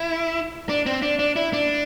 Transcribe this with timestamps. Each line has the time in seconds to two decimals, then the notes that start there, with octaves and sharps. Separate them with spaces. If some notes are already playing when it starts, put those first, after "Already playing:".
Already playing: E4
0.69 D4
0.86 C4
1.02 D4
1.19 D4
1.36 E4
1.53 D4